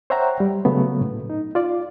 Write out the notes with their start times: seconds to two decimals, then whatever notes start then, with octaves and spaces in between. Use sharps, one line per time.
0.10 C5 C#5 E5 F#5 G5 A#5
0.40 G3
0.65 C#3 F#3 A3 B3
1.01 A2
1.30 D#4
1.55 F4 D5